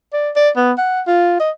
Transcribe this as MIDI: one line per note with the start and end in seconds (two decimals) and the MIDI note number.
0.13 0.30 74
0.36 0.50 74
0.56 0.73 59
0.78 1.01 78
1.07 1.36 65
1.40 1.51 75